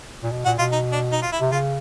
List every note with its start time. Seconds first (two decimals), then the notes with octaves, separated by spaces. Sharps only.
0.23 A#2
0.33 B2
0.45 A#2 F#4
0.59 B2 F4
0.72 D#4
0.92 D4
1.12 D#4
1.23 F4
1.32 E4
1.41 C3
1.52 C#3 F4